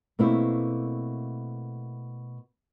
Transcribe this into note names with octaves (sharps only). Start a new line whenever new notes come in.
B2 A3 A#3 C4 E4